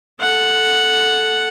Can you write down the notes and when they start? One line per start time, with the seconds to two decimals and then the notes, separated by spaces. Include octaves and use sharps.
0.21 A4 F#5